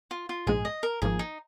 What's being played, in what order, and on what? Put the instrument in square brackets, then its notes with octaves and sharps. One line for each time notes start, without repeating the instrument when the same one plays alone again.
[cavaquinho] F4
F4
[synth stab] A#1 G#2 G#3 [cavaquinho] G#4
[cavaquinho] D#5
A#4
[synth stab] G#1 G#2 F3 A#3 [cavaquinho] G#4
[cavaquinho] D#4